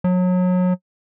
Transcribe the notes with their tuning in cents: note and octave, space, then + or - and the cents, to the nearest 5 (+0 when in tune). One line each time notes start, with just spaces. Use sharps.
F#3 -30